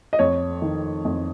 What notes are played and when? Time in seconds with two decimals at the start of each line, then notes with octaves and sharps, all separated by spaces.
0.13 D#5
0.19 F2 C#5
0.62 D#3
1.05 F2